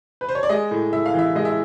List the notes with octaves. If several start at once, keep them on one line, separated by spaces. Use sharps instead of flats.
B4
C5
C#5
D5
G#3 D#5
A2
A2 E5
F5
E3 E5
G#3 D#5
E5